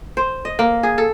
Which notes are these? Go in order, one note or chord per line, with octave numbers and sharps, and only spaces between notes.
C5
D#5
A#3
G#4
A4